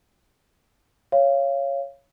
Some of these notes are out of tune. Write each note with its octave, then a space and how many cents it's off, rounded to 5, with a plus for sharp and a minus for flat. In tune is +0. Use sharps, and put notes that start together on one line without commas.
C#5 +0 F5 -20